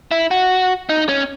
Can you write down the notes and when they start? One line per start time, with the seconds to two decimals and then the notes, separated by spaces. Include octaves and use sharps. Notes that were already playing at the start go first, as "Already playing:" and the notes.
0.11 E4
0.31 F#4
0.89 D#4
1.09 C#4